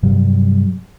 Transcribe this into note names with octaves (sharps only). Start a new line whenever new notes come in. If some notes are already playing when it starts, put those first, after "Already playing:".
G2 C3 F#3 G3